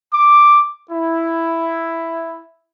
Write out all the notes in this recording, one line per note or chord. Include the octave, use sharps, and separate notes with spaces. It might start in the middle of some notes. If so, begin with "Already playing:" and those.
D6
E4